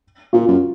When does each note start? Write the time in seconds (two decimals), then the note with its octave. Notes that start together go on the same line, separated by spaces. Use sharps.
0.33 A#2 F4
0.48 F#2